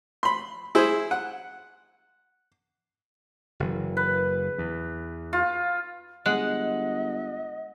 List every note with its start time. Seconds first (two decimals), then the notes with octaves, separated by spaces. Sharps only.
0.23 B5 C6
0.75 E4 G#4 C5
1.11 F#5
3.60 F#1 E3
3.97 B4
4.58 E2
5.33 F4
6.26 G1 G#3 D#5 F#5 F#6